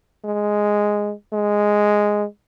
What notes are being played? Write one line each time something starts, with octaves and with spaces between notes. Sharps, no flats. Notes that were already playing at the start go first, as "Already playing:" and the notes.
G#3
G#3